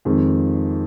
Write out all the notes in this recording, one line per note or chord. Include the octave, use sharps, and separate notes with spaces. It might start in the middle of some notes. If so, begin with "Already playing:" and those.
F2 D#3 G#3